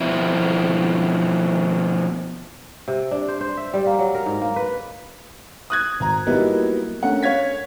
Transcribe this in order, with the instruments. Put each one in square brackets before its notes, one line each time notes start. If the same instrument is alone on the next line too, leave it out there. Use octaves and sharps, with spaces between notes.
[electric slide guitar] B2 F3 C4 E4
[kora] C3
D4
C5
C5
E5
G3
A#3
F#3
A#4
G#2
A#3
B4
[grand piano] D#6 F#6 G#6
G#1 A#5
F#3 G3 A#3 B3 D#4 E4
A3 C#4 D4 A#4 F#5
C#5 F5 G#6 B6